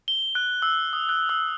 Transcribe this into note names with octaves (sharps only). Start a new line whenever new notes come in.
G7
F#6
E6
D#6
F#6
E6